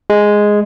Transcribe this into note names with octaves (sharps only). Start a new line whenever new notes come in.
G#3